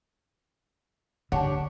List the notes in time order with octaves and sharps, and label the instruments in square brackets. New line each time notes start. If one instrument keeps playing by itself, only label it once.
[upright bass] D3 [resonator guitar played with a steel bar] D4 G4 C#5 [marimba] F#5 A5